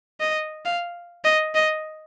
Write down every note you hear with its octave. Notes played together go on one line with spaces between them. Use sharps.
D#5
F5
D#5
D#5